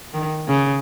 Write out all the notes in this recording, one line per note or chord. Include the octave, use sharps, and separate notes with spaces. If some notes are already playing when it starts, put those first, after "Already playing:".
D#3
C#3